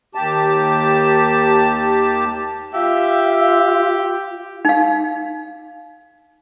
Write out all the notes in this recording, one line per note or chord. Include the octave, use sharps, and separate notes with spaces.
D#2 G4 A5
F4 G4 E5 F5
D#4 F5